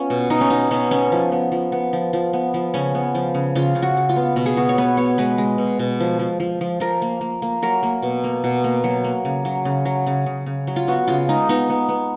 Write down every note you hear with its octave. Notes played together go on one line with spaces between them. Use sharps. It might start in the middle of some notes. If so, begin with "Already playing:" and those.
Already playing: B3 C#4 F4
B2
B2 D#4
C#4
B2 D#4
B2 C#4
B3 C#4
F3
B3
F3
B3
F3
F3
B3
F3
C#3 C#4
B3
F3
C#3
C#3 F4
C#3
F#4
C#3
F4
B3
B2
G#4
B3 F#4
C#5
B3 B4
B3 C#5
G#3 B4
G#3
B2
B2
F3
F3
F3
F3
F3 A#4
A#3
A#3
A#3
F#3 A#4
A#3
B2
A#3
B2
A#3
F#3
A#3
C#3
F#3
C#3
F#3
C#3
C#3
C#3
F#3
F4
B3 F#4
C#3 F4
G#3 D#4
B3 D#4
B3
B3